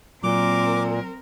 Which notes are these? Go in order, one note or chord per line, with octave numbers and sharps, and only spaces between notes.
A#2 F#3 C4 A#4 D6